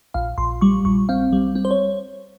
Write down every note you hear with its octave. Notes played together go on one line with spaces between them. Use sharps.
A#1 F5
A#1 C6
G3 C#6
A#1 C#6
C4 F5
G3
C4
C5
C#5